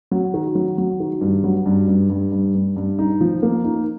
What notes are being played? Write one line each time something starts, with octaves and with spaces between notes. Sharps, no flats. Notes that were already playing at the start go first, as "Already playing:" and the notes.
F#3
D#3
F#3
F#3
D#3
G2
F#3
G2
G2
G2
G2
G2
G2
D#4
F3
A#3
D#4